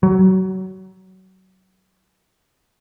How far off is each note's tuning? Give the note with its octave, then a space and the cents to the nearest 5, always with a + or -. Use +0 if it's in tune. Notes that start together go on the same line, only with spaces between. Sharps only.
F#3 +25